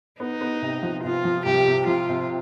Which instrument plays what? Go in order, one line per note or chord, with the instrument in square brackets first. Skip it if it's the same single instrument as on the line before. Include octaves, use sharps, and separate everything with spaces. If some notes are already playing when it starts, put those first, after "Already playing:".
[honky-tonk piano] B3 [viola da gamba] D#4
[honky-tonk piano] B3
C3
F3
[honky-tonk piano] C3 [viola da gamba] F4
[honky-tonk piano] F3
[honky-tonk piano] C2 [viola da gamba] G4
[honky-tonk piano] C3
[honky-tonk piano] F3 [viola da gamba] F4
[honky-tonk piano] C3